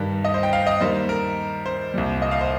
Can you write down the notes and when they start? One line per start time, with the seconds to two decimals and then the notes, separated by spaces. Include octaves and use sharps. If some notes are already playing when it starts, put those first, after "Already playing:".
Already playing: G2 D#3 G3
0.25 D#5
0.34 C5
0.43 G5
0.53 F5
0.67 D#5
0.81 D#2 D#3 G3 C5
1.09 A#4
1.66 C5
1.94 C2 A#2 G3
2.22 D#5
2.31 F5
2.41 C5